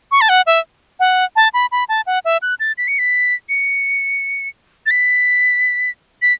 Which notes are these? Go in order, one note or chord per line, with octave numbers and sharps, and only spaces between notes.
C#6
A5
F#5
E5
F#5
A5
B5
B5
A5
F#5
E5
F#6
A6
B6
C#7
B6
C#7
A6
B6
B6